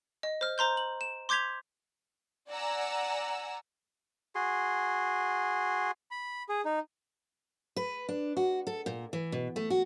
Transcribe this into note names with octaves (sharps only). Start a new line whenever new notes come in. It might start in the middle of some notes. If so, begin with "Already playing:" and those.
D#5
C5 F6
C5 A#5 C6 G6
F#7
E7
C6 D6 G6 G#6 B6 F7
D5 F#5 G#5 A#5 E6
F#4 G#4 C6
B5
G#4
D#4
B4
D4
F#4
A4
A#2
E3
B2
A3
F#4